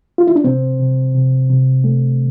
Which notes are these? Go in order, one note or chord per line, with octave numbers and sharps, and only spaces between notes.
F4
E4
D4
C3 C4
C3
C3
C3
A3